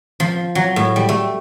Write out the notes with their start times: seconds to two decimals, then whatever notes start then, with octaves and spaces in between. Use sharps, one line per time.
0.20 F3
0.55 F#3
0.76 A2
0.96 G3
1.09 A3